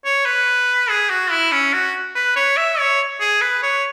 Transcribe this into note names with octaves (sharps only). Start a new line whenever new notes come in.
C#5
B4
G#4
F#4
E4
C#4
F#4
B4
C#5
E5
C#5
G#4
B4
C#5